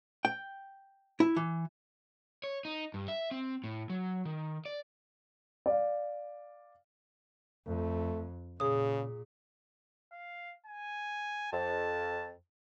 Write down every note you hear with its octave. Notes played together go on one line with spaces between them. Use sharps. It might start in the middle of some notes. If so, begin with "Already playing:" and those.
G5
E4
E3
C#5
D#4
G2
E5
C4
A2
F#3
D#3
D5
D5 F5
F2 A3
A#2 C#3 G#4 D#6
F5
G#5
F2 A5